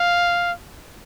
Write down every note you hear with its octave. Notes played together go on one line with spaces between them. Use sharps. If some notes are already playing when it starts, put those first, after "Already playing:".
Already playing: F5